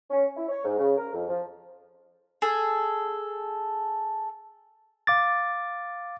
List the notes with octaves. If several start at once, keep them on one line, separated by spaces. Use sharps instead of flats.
C#4
E4
C#5
G#2
C#3
A#4
F2
F3
G#4 A4
F5 D6 A6